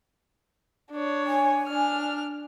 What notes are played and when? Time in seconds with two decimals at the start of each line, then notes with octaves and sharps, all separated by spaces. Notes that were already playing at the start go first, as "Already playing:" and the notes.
0.92 D4 C#5
1.27 G#5
1.68 D4 F6